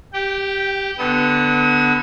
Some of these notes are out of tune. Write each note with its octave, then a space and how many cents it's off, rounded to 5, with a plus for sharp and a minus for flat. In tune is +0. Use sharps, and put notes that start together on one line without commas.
G4 +0 G5 -25
D3 +0 B3 +0 D#6 +40